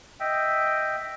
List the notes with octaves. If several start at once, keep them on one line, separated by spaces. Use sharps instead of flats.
D#5 E5 G5